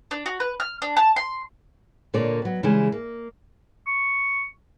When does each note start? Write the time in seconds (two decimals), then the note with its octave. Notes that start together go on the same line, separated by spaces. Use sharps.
0.11 D4
0.26 F#4
0.40 B4
0.60 F6
0.82 D4
0.97 A5
1.16 C6
2.14 A#2 D3 A#3 C#5 D5
2.42 F#3 B3
2.63 C#3 E3 G3 G#3 E4 G#4
2.92 A#3
3.87 C#6